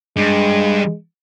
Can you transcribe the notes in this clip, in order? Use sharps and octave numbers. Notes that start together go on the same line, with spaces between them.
G2 G#3